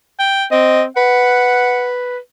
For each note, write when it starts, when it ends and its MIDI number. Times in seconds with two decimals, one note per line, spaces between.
0.20 0.45 79
0.51 0.86 60
0.51 0.83 75
0.97 2.18 71
0.97 1.90 78